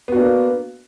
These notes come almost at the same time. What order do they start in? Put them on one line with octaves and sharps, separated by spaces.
B3 F#4 D4 A#3